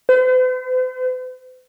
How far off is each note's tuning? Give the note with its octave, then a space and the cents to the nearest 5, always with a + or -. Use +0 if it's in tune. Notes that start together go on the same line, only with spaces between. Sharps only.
C5 -45